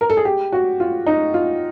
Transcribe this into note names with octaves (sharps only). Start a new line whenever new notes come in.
A#4
A4
G#4
G4
F#4
F4
D#4
F4